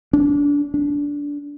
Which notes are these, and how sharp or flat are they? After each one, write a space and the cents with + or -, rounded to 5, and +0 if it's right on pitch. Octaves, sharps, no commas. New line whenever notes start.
D4 -25
D4 -20